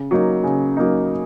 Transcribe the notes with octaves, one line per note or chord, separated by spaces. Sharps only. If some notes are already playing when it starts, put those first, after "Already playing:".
Already playing: C#3
F#3 A#3 D#4
C#3
F#3 A#3 D#4